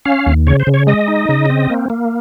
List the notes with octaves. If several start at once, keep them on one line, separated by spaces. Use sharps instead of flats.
C#4 F5
D#2
C#3 C#5
C5
C#3
C#5
G#3 D#5
D#4
C#3
C4
A#3
A#3